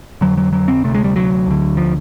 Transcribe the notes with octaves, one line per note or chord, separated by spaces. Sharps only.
F2 D3 F#3
F#3
F#3
C4
D2 C3 A3
G#3
G3
F#3
D2 D3
F3